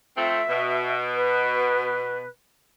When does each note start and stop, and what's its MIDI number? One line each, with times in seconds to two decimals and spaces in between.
0.17 0.41 41
0.17 0.41 57
0.17 0.41 60
0.17 0.92 76
0.48 2.23 47
1.15 2.27 71